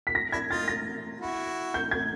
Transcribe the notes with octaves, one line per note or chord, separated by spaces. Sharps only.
B6
A#6
D4 E4 G#6
D#4 F4 A6
A#6
E4 F#4
G6
G#6